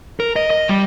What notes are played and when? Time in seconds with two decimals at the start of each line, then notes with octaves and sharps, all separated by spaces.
0.20 A#4
0.36 D#5
0.50 D#5
0.69 G3